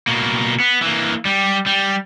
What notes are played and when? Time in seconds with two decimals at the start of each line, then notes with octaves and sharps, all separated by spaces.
0.07 B2 A#3
0.60 B3
0.82 E3 A#3
1.25 G3
1.66 G3